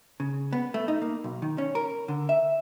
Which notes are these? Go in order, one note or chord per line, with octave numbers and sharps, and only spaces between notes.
C#3
B3
A3
D#4
A#3
B1
D#3
C#4
A#4
D3
E5